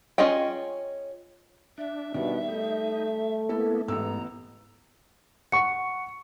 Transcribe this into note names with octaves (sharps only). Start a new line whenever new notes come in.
C#4 F4 G#4 D#5 G5
D4 E5
B2 D#3 G3 D4
A3 D#4
A#3 B3 E4 A4
A1 G#2 B3 A#5 E6
F#5 C#6 C#7